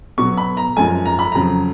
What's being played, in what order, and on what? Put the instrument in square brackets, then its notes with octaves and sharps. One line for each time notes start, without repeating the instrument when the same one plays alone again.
[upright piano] B2 F#3 B3 C#6
B5
A#5
F#2 F3 G#3 G#5
A#5
B5
F2 C#3 F#3 A#5